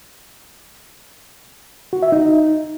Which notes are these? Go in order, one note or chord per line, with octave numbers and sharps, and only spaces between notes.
F#4
E5
D#4